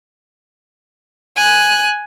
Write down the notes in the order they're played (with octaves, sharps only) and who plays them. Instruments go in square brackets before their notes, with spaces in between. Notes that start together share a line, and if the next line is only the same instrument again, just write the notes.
[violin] G#5 F#6